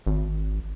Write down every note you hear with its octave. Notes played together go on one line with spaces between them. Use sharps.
G#1